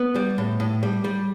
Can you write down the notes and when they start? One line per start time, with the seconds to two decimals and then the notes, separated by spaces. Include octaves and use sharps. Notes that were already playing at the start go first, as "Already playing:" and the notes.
Already playing: B3
0.15 G3
0.38 A2
0.60 A2
0.83 G3
1.04 G3